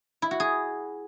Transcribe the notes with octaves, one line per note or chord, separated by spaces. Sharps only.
E4
F#4
G#4